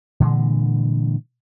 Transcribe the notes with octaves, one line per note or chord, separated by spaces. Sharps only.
A#2 D3 E3 G#3